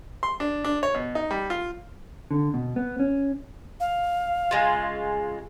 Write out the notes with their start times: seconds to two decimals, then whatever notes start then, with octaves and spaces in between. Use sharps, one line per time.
0.23 C6
0.40 D4
0.64 D4
0.83 C#5
0.94 B2
1.15 D#4
1.31 G3
1.50 F4
2.31 D3
2.54 B2
2.76 B3
2.99 C#4
3.80 F5
4.51 C#3 G#3 F4